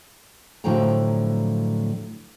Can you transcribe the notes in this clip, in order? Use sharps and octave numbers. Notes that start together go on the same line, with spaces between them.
A2 D3 F3 F#3 G5 A#5